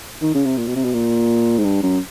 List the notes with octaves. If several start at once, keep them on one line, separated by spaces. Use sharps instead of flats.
D#3
C#3
C3
A#2
B2
C3
B2
A#2
G#2
G2
F#2